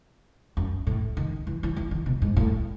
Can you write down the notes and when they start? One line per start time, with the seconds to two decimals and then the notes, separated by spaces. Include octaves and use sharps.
0.57 F#2
0.87 A2
1.17 D#3
1.47 E3
1.63 E3
1.76 E3
1.91 D#3
2.06 B2
2.22 G#2
2.37 A2